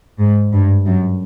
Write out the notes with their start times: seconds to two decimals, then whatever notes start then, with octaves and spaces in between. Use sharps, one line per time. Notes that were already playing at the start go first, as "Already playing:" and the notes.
0.20 G#2
0.52 G2
0.86 F#2